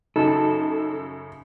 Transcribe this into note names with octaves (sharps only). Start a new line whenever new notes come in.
F#2 C#3 D#4 A4